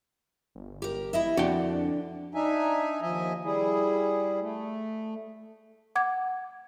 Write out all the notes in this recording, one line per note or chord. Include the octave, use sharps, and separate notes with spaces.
G1
G4 A#4
E4 D#5 E5
F2 D3 D4 F#4 G5
D4 D#4 E5 G#5
D#2 F3 D#5 E5 G#5
G3 E4 G#4
A3
F#5 D6 G#6